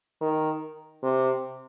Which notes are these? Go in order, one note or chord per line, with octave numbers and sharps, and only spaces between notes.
D#3
C3